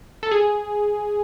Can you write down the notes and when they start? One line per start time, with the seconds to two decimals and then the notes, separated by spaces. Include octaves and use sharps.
0.23 A4
0.31 G#4